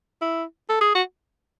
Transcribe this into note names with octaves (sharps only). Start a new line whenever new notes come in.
E4
A4
G#4
F#4